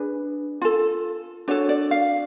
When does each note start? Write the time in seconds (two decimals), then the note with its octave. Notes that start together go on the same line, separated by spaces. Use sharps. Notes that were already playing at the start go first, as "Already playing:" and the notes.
Already playing: D4 G#4 B4
0.62 F4 A4
1.48 D4 F#4 A4 C#5
1.69 D5
1.91 F5